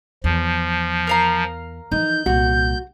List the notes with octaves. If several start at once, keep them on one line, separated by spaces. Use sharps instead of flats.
E2 F3
A#4 F5 A#5
E3 F3 D#4 G6
C2 A#2 F#4